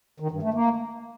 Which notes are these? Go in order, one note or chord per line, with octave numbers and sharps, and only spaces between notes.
D#3
G2
A3
A#3